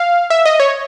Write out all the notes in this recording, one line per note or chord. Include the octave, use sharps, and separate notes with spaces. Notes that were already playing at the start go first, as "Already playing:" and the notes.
Already playing: F5
E5
D#5
C#5